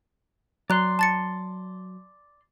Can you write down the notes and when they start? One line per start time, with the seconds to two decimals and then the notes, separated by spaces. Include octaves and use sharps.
0.70 F#3 D5 A#5 C6 F#6
0.99 A5 A6 C#7